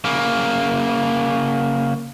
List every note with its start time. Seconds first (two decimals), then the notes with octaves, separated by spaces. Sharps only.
0.05 C#3 A#3